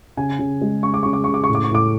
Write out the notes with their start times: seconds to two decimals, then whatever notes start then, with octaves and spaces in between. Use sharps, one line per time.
0.17 C#3 G#5
0.39 C#3
0.61 G#3
0.83 C#4 C#6
0.94 D6
1.03 C#3 C#6
1.13 D6
1.24 C#3 C#6
1.34 D6
1.44 C#6
1.49 A2
1.55 D6
1.64 C#6
1.71 A2 D6